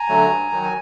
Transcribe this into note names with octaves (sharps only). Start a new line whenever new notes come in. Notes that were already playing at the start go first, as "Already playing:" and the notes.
Already playing: G#5 A#5
D3 F#3 A3
G2
D#3 F#3
G#5